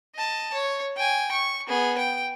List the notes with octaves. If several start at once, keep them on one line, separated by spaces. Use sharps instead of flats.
D#5 A5
C#5
G5 G#5
C#6
B3 G#4
G5